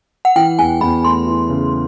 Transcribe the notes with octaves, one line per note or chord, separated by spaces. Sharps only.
F#5
E3 G5
E2 G#5
E2 B5
A3 C6
E3
C#3